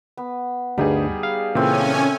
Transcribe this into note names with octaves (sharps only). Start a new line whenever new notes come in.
B3
D2 G2 G3 D#4 G4 G#4
F5
A#2 C#3 E3 A3 C4 C#4 A4 G#5